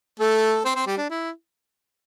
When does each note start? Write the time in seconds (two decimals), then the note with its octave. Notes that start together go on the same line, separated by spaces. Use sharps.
0.20 A3 A4
0.65 C4 C5
0.75 C4 C5
0.87 G3 G4
0.98 D4
1.10 E4